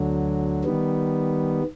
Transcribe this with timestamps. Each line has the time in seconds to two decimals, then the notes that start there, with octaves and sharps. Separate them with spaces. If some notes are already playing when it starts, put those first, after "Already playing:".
Already playing: D2 D3 F#3
0.64 D#3 G3 B3